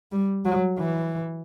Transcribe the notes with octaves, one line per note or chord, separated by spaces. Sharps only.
G3
F#3
E3